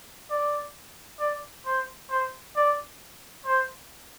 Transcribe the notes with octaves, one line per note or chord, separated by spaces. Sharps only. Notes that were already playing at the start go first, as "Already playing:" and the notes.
D5
D5
C5
C5
D5
C5